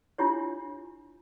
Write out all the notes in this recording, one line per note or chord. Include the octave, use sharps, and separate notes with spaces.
D4 E4 F4 G4 C#5